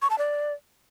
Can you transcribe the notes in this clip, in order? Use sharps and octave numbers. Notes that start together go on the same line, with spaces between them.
C#6
A5
D5